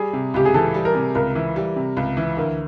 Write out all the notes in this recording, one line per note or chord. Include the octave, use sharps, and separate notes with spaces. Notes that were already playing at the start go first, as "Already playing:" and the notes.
Already playing: G3 G#4
C3
C#2 G4
G#4
E3 A4
G3
A#4
C3
C#2 A#4
E3
G3
C3
C#2
E3
D2 A#4